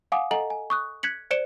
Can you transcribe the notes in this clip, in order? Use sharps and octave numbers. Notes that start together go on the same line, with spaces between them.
F5 F#5 G#5 D6 D#6
A4 D#5 F#5 G#5 A#5 F#7
G#5
C#6 D#6 F#6
F#6 G#6 B6 C#7 F#7
C5 D5 C#7 D7 E7 G7